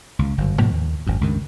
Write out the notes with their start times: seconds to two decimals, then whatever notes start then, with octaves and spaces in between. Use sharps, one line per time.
0.19 C#2
0.38 G1 F#2
0.59 G#2 B2 F3 A#3
0.74 D#2
1.07 G#1 F#2
1.21 C#2 G2 D#3